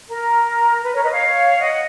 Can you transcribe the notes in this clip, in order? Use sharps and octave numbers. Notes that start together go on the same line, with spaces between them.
A#4
B4
A#4 C#5
B4 D#5
C#5 F5
D#5 F#5